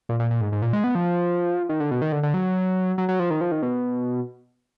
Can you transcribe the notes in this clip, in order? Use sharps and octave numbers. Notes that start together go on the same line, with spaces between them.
A#2
A#2
A#2
G#2
G#2
A#2
G#3
B3
F3
D#3
D3
B2
D#3
D3
D3
F#3
F#3
F#3
F3
D#3
F3
D#3
B2